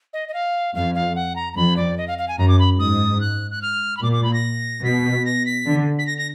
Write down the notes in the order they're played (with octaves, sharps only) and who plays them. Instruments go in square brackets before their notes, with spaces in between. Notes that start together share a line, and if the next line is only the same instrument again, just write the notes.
[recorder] D#5
D#5
F5
[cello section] F2 [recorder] F5
[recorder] F5
F#5
A#5
A#5
[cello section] F2 [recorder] B5
[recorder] D5
D#5
F5
F5
G#5
[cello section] F#2 [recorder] A#5
[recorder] D6
B5
[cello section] G#2 [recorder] D#6
[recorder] F#6
F#6
F6
B5
[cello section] A#2 [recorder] D6
[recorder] D6
B5
A#6
[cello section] B2 [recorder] B6
[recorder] A#6
B6
[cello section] D3
[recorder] B6
A#6
A#6